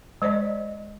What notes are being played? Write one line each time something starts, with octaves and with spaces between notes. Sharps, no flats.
G#3 C5 D5 D#5